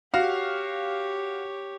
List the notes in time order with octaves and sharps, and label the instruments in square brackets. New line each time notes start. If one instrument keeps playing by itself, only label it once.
[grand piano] F#4 F5 [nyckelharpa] G4 C#5